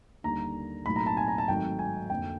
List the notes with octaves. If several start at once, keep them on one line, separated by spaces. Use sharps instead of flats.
D#2 D3 G3 A#3 A#5
B1 A2 F#3 A#3 B5
A#5
A5
G#5
A#5
A5
G#1 G#2 D#3 F#3 A3 G5
G#5
F2 D3 F#3 A#3 G5